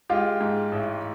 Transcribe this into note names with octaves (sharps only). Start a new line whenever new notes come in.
G#3 F4 G4
G#2
A1